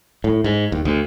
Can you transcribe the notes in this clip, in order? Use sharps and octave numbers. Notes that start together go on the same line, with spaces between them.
A2
G#2
D#2
D2